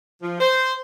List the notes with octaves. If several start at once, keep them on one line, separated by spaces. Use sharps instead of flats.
F3
C5